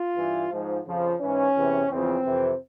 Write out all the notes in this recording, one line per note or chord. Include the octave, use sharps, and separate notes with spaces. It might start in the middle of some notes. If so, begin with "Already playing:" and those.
Already playing: F4
G2 E3
G#2 F3
F2 C#3 F3
G#2 E3 C#4
E2 C3 E3
E2 C#3 F3 C4
F2 C3 E3